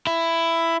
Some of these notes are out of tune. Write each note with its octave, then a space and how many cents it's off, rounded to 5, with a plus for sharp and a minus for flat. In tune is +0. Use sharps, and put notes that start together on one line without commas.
E4 +10